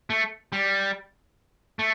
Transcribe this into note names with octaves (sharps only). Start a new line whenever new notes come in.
A3
G3
A3